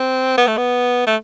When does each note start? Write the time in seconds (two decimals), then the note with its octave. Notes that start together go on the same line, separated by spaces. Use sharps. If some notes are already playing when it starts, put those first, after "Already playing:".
Already playing: C4
0.37 B3
0.47 A3
0.57 B3
1.07 A3